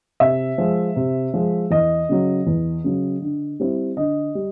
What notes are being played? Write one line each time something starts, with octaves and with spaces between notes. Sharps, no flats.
C3 E5
F3 G#3
C3
F3 G#3
E2 D#5
C#3 F#3
E2
C#3 F#3
D3
G3 C4 E4
D3 D#5
G3